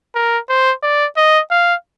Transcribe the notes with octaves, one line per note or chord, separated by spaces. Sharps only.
A#4
C5
D5
D#5
F5